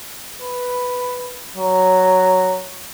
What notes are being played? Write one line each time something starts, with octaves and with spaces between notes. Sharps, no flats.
B4
F#3